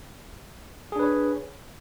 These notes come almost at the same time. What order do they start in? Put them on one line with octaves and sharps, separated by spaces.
G#4 D4 B4 C#5